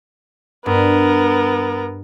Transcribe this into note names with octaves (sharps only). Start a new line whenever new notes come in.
G2 B3 A#4